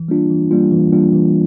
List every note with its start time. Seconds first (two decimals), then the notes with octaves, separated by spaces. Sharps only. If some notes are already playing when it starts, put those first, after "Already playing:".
Already playing: E3
0.09 G3 A#3 D4 F4
0.30 E3
0.51 G3 A#3 D4 F4
0.72 E3
0.92 G3 A#3 D4 F4
1.13 E3